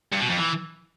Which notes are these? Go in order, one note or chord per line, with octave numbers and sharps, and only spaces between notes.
G2
B2
F2
E3